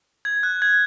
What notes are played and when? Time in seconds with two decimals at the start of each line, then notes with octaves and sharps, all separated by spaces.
0.25 G#6
0.43 F#6
0.62 G#6